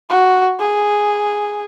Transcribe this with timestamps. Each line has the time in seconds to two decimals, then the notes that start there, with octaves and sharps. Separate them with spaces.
0.10 F#4
0.59 G#4